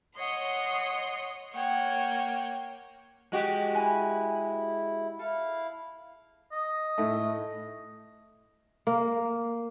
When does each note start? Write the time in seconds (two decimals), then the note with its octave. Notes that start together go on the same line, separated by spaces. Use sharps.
0.16 C#5 D#5 F#5 C6
1.53 A#3 C#5 F#5 G5
3.32 G#3 F#4 G4
3.74 E4 D#5 G#5 B5
5.19 E4 A4 F5
6.52 D#5
6.98 A2 A3
8.87 A#3